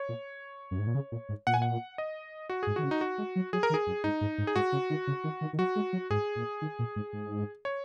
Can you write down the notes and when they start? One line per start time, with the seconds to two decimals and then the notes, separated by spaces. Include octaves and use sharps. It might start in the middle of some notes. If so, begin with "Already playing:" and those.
Already playing: C#5
0.09 A#2
0.71 F#2
0.79 G#2
0.87 A#2
0.95 C#3
1.12 A#2
1.29 G#2
1.47 A#2 F#5
1.54 G#5
1.62 F#5
1.98 D#5
2.50 F#4
2.63 G#2 G#4
2.76 D#3 F#4
2.84 C#3
2.91 D#4
3.01 F#4
3.18 G#3
3.36 F#3
3.53 F#3 G#4
3.63 A#4
3.70 D#3
3.74 G#4
3.87 F#2
4.04 G#2 D#4
4.21 G#2
4.38 G#2
4.47 G#4
4.55 G#2 F#4
4.72 C#3
4.90 D#3
5.07 C#3
5.24 D#3
5.41 D#3
5.53 D#3
5.58 F#3 F#4
5.76 G#3
5.93 F#3
6.10 G#2 G#4
6.36 A#2
6.62 D#3
6.79 A#2
6.96 G#2
7.13 G#2
7.65 C#5